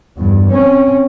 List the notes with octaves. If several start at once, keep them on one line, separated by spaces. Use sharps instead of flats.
E2 G2
C4 C#4